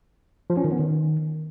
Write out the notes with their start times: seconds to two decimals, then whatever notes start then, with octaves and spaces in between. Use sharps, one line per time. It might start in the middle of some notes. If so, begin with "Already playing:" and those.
0.50 F3
0.57 C#4
0.64 D#3
0.72 B3
0.79 D#3